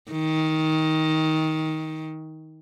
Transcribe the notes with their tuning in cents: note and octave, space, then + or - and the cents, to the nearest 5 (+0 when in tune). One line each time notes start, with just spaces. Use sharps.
D#3 +15